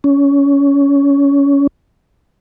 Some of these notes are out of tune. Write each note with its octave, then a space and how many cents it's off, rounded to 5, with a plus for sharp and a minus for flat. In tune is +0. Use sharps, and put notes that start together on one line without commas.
C#4 +20